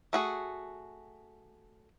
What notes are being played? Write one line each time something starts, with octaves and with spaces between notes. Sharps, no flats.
A3 F#4 G#4